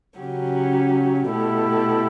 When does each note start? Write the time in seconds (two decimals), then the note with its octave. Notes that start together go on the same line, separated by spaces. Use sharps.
0.19 C#3 F#3 C#4 G4
1.28 B2 A3 E4 G4